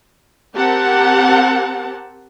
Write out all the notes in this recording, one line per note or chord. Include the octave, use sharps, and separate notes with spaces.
C4 G4 A#4 F#5 A5